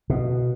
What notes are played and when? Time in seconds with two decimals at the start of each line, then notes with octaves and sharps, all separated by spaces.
0.10 B2